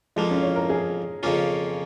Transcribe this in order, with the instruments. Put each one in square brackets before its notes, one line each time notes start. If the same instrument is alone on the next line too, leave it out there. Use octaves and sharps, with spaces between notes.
[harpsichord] F2 F3 A#3 [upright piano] G#3
[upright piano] C#4
C#5
A#4
G#4
[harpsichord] F2 C#3 A#3 C#4 F4